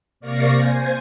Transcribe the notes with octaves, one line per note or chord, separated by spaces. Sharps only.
C3 A#3 D5 F5 C#6 A#6
C5 G#5